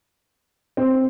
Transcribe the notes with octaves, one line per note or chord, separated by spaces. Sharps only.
C4